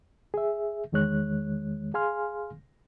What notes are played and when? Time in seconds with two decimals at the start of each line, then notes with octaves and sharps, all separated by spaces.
0.34 G#4 E5
0.92 E2 D#3 G#3 C#5 F#6
1.94 G#4 F5 G#5 C6 F6